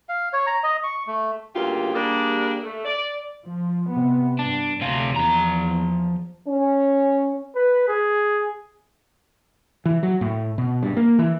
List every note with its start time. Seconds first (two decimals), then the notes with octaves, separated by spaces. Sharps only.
0.09 F5
0.33 C#5
0.47 A#5
0.63 D#5
0.84 C#6
1.07 A3
1.55 D2 G2 C#3 A#3 F4 G4
1.94 G3 A#3 D4 G4 G#4 A#4
2.63 A3
2.85 D5
3.45 F3
3.89 C3 B3
4.39 G2 D4
4.81 D2 C3 F4
5.16 E2 F3 A#5
6.47 C#4
7.55 B4
7.88 G#4
9.86 E3
10.03 F#3
10.21 A2
10.58 B2
10.83 G2
10.97 A#3
11.19 E3